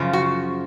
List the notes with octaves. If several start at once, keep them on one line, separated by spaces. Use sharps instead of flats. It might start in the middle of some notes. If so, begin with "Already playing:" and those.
Already playing: F#2 C#3 F3
F#4